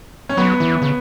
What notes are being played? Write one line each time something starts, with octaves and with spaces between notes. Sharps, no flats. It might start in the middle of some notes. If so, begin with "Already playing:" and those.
C#4
F#3 B3
E3
C#3